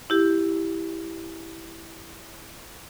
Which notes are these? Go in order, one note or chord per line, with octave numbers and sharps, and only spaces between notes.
E4 G4